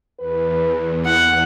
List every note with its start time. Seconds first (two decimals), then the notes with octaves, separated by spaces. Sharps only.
0.19 E2 B4
1.05 E4 F#5